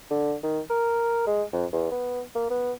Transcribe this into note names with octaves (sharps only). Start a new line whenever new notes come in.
D3
D#3
A#4
G#3
F2
E2
B3
A#3
B3